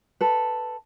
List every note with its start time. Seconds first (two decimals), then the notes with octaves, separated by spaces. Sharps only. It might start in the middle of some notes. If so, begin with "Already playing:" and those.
0.21 A4 B4